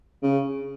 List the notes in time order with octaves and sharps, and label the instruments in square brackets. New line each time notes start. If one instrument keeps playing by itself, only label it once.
[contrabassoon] C#3